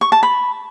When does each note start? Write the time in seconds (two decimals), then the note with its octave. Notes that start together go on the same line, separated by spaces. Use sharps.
0.01 C#6
0.12 A5
0.23 B5